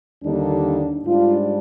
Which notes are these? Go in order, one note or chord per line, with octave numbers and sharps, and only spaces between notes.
D#2 D3 G3 A#3 D4 D#4
G#2 G3 D4 F4